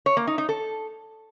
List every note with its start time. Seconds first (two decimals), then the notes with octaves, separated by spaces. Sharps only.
0.06 C#5
0.17 A#3
0.27 D#4
0.38 D#4
0.49 A4